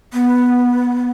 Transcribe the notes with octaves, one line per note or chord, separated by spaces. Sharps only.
B3